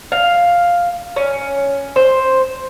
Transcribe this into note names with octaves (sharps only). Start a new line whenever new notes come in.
F5
C#4
C5